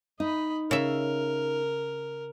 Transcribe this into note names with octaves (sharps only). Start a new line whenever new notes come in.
D#4 D#5 B5
C#3 A#4 E5